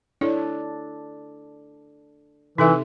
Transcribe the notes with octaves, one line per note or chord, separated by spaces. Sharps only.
D4 E4 A4 C#5
C3 E3 D#4 A4 E5